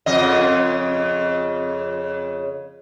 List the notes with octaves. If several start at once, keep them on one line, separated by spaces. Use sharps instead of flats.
F2 C#3 D#5